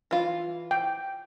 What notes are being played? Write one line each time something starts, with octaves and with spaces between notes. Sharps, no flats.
E3 F4
G5